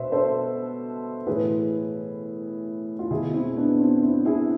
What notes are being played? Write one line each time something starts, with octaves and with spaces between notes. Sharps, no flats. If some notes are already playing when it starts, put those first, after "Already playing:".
Already playing: B2 B4 C5 E5
A4 C5
A2 E3 G#4 B4
F4
B2 E4 G#4
C4 E4
B3 D4
C4 E4
C4 E4
E4 G#4